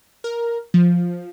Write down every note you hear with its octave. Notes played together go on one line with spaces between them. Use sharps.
A#4
F3